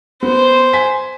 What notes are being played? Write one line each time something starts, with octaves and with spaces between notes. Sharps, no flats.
B3 C5
G#5 B6